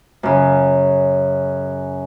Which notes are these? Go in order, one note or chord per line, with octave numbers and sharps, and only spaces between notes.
F#2 C#3